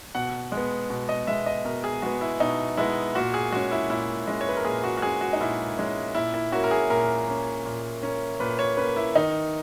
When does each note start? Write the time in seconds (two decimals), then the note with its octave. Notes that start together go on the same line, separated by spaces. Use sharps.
0.15 B2 F#5
0.52 G#3
0.57 B3
0.90 B2
1.09 D#5
1.27 G#3 B3 E5
1.46 D#5
1.65 B2 A#4
1.84 G#4
2.02 G#3 B3 F#4
2.21 E4
2.40 B2 D#4
2.77 G#3 B3 E4
3.15 A#2 F#4
3.34 G#4
3.52 G#3 C#4 F#4
3.71 E4
3.90 A#2 E4
4.27 G#3 C#4
4.41 C#5
4.49 B4
4.57 A#4
4.65 A#2 G#4
4.84 F#4
4.97 F#4
5.02 G#3 C#4 G#4
5.21 F#4
5.33 D#4
5.41 A#2 E4
5.77 G#3 C#4
6.15 A#2 E4
6.34 E4
6.52 A#3 C#4 F#4
6.64 A#4
6.71 G#4
6.90 A#2 A#4
7.27 A#3 C#4
7.65 A#2
8.03 A#3 C#4
8.40 A#2 B4
8.59 C#5
8.77 A#3 C#4 B4
8.96 E4
9.15 D#3 D#4